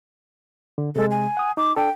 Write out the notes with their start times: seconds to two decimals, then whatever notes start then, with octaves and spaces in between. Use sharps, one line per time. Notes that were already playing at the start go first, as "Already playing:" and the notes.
0.78 D3
0.96 C3 G#3 A4
1.11 G#5
1.37 F#5 D#6
1.57 D#4 D6
1.76 D4 A4 G5